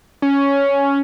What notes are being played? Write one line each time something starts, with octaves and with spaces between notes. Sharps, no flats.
C#4